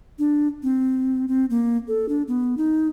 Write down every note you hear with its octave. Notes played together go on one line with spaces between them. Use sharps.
D4
C4
C4
A#3
A4
D4
B3
D#4